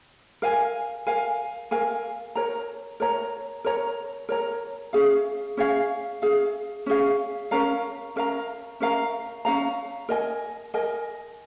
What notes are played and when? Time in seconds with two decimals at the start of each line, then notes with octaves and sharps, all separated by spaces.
0.42 A#4 F5 G#5
1.07 A#4 F5 G#5
1.71 A#4 F5 G#5
2.35 A#4 C#5 A#5
3.00 A#4 C#5 A#5
3.64 A#4 C#5 A#5
4.29 A#4 C#5 A#5
4.93 C#4 G#4 F5
5.57 C#4 G#4 F5
6.22 C#4 G#4 F5
6.86 C#4 G#4 F5
7.51 C#4 A#4 F5 A#5
8.16 C#4 A#4 F5 A#5
8.80 C#4 A#4 F5 A#5
9.45 C#4 A#4 F5 A#5
10.09 A#4 D#5 G#5
10.74 A#4 D#5 G#5